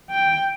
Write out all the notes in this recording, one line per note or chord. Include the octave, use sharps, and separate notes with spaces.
G5